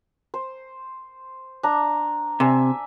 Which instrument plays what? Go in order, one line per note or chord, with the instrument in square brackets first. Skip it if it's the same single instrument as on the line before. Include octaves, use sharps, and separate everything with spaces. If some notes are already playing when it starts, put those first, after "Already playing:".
[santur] C5
D4 A#5
[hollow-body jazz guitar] C3 [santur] D5 E5 G#5